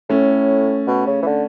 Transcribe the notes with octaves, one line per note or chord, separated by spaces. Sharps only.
A2 A3 C#4
B2
C#3
E3
D3